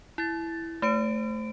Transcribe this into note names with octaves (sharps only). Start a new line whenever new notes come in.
E4 A6
A3 C5 D7